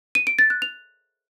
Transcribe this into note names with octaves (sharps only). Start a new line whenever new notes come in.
D#7
D7
A6
F#6
F7